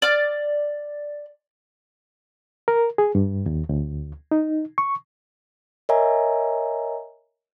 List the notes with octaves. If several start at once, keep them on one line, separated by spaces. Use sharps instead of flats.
D5 F6
A#4
G#4
G2
D#2
D2
D#4
C#6
A#4 C#5 D#5 E5 G#5 A#5